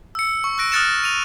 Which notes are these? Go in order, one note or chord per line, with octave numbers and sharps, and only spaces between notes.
E6 C#7
C#6
E6 F#6 A#6 D7
D#6 F6 F#6 A6 C#7 E7
D#7 F7